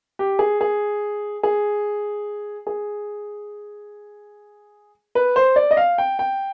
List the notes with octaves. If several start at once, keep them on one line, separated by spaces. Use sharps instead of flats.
G4
G#4
G#4
G#4
G#4
B4
C5
D5
D#5
F5
G5
G5